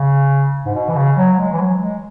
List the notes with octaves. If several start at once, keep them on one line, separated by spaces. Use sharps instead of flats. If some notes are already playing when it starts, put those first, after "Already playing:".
Already playing: C#3
G#2
B2
E3
C#3
F#3
F#3
G#3
E3
F#3
G#3